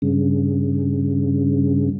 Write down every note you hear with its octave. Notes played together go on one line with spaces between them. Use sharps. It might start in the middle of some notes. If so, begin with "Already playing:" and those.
G2 C#3